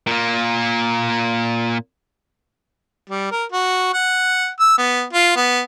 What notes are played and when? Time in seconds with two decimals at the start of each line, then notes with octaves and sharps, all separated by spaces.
0.07 A#2 A#3
3.09 G3
3.32 A#4
3.52 F#4
3.94 F#5
4.60 E6
4.78 B3
5.13 F4
5.36 B3